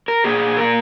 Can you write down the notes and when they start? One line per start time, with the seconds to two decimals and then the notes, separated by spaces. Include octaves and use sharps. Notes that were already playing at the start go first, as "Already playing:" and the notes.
0.08 A#4
0.24 A#2 A#3 G#4
0.57 A#4